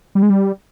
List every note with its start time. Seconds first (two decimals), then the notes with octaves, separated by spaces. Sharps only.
0.15 G3
0.23 G#3
0.30 G3